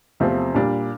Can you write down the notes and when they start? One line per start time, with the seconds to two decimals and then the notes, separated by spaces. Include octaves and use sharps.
0.20 E2 C3 F3 A3 C4
0.54 A#2 G3 D4